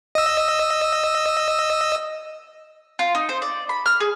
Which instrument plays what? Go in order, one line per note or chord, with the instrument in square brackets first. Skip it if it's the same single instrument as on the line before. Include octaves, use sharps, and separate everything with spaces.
[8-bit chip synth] D#5 E6
[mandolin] F4
D#4
C5
D5
B5
F6
G#4